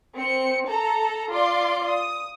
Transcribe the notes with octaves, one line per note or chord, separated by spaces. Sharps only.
C4 C#7
A4 A#5
F4 D5 C6 D6
D#6